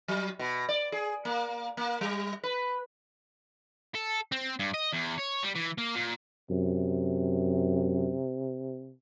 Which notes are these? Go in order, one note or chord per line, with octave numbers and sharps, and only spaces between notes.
F#3
B2
D5
G#4
A#3
A#3
G3
B4
A4
C4
G2
D#5
E2
C#5
G3
E3
A#3
A#2
F#2 C3